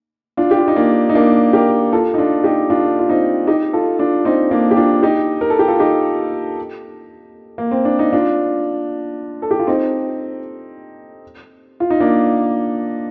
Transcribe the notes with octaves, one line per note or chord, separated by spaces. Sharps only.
D4 F4
G4
F4
D#4
A#3 D4
D#4
A#3 D4
G4 A#4
F4 A4
D#4
D4 F4
D#4 G4
D4 F4
F4
C4 D#4
D#4 G4
F4 A4
D4 F4
C4 D#4
A#3 D4
G4
D4 F4
D#4 G4
A#4
A4
G4
F4 A4
D#4 G4
A#3
C4
D4
D#4
D4 F4
A4
G4
F4
C4 D#4
F4
D#4
A#3 D4